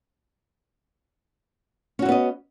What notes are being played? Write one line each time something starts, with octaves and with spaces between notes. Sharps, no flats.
B3 C#4 E4 F#4 D#5